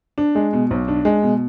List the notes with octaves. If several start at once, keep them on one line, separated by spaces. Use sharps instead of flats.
D4
G#3
B2
B1
D4
G#3
B2